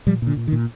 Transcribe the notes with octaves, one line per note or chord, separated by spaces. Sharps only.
A#2 F3 G3
A#2
D3
A#2
D#3
A#2